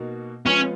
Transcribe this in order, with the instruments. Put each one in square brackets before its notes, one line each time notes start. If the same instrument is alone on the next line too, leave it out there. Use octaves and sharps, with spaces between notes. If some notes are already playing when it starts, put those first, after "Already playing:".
Already playing: [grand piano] B2 A#3 D#4 F#4
[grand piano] F3 G#3 B3 F4 [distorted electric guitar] C#4